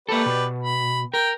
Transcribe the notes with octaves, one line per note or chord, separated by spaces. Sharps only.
A#3 G4 A4 B4 D5
B2
B5
A#4 G5